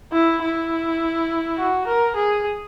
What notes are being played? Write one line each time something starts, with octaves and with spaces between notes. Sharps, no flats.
E4
E4
F#4
A#4
G#4